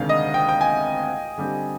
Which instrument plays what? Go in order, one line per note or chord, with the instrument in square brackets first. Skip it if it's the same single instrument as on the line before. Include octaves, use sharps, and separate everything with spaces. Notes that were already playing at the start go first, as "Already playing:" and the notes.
Already playing: [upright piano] D2 C3 D#3 G#3 D4 [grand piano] F5
[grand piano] D#5
G5
G5
G#5
[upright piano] D3 G3 C4 G4